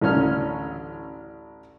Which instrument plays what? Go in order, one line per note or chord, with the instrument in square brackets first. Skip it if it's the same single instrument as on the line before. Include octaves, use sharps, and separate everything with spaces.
[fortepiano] A1 D2 C#4 F6